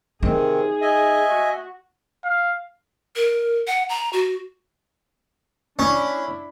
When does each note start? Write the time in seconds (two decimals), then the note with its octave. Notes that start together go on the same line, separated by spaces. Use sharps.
0.23 C3 D#3 C4 D#4 G#4
0.81 D#5 E5 G#5
1.31 F#4
2.24 F5
3.16 A#4
3.67 F#5
3.89 A#5
4.13 F#4
5.79 C#4 D4 E4 B5